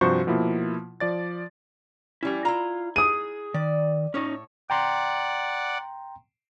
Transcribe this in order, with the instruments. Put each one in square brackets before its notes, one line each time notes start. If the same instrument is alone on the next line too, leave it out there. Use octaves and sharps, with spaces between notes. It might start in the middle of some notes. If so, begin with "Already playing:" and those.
[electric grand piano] G2 C3 F3 F#4 C5 C#6
B2 F3 A#3 E4
F3 D5 A6
[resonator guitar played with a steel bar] G3 C#4 [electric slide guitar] E4 G#5
[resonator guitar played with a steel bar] E4 A#5 [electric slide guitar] F4
[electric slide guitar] G#4 [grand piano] D#6 D#7
[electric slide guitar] D#3 [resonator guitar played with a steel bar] D5
[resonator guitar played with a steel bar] A2 C#5 [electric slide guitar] C#4 D#4
[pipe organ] D5 F#5 [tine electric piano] G5 A#5 C6